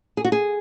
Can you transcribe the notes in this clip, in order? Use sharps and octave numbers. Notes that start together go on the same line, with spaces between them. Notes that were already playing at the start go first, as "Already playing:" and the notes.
G#4
F#4
G#4